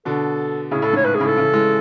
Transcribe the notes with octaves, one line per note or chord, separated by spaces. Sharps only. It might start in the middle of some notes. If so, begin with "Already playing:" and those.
B2 D3 A4
A2 C#3 G#4
A2 A4
G#2
C#5
A2 B4
G#4
A2 C#3
A4
C#3 E3
E3 G#3